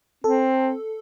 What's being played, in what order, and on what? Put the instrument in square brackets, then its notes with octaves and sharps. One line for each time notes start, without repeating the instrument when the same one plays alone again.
[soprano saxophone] C4 [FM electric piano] A4